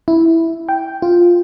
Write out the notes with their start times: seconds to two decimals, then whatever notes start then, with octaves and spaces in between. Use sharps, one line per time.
0.08 E4
0.69 G5
1.02 F4